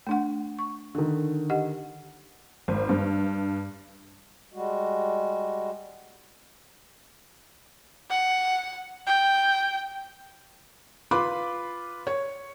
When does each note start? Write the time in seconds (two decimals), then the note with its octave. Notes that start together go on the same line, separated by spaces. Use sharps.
0.07 A3 D4 F#5
0.59 C#6
0.95 D3 D#3
1.50 G4 D#5 F#5
2.68 G#1
2.89 G2
4.54 G3 G#3 F#4
8.10 F#5
9.07 G5
11.11 F4 B4 B5 C6 D6
12.07 C#5